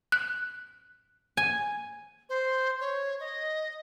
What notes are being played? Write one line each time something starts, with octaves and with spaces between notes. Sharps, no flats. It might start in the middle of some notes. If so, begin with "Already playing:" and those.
F#6
G#5
C5
C#5
D#5